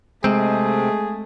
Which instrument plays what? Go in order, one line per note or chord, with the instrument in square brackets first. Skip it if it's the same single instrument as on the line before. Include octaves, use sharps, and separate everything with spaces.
[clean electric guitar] C3 C4 [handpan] G#3 [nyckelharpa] A3 [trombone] G#4